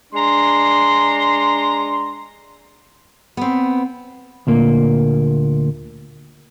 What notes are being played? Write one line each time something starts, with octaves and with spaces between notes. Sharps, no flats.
G#3 D4 A#5 C6
B3 C4
D2 A#2 A#3